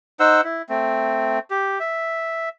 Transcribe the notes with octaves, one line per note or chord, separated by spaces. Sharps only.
D#4 C5 F#5 E6
E4
A3 C4
G4
E5